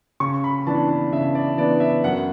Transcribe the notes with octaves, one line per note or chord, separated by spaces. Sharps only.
C#3 C#6
B5
E3 B3 D4 A5
C#3 E5
D5
E3 B3 D4 D5
E5
F#2 F#5